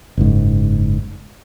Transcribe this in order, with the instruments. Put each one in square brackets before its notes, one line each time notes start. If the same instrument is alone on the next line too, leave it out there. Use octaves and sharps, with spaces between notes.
[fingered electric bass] F#1 G#2